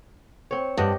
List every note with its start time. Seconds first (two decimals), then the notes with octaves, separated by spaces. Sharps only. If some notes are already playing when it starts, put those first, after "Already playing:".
0.51 C4 C#5
0.77 G2 G4 D#5 F#5